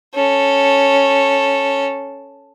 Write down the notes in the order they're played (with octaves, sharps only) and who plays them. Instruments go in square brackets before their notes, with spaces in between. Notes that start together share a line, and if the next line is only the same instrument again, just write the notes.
[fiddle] C#4 A4